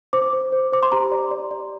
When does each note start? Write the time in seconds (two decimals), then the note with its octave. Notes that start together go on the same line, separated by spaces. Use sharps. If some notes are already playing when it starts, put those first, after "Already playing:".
0.13 C5 D6
0.33 C5
0.52 C5
0.72 C5 D6
0.83 C6
0.92 G4 A#5
1.12 D5
1.31 D5
1.51 D5